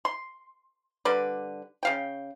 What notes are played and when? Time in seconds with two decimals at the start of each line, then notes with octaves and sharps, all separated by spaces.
0.05 C6
1.05 D3 G3 B4 D5
1.83 C#3 F5 G5